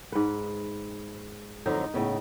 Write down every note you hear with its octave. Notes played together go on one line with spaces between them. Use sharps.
G#2 B4
F2 D3 F#3 D#4
A2 C#3 B3